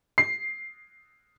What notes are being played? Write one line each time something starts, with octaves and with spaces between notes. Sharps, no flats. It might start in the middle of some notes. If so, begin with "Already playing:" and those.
C7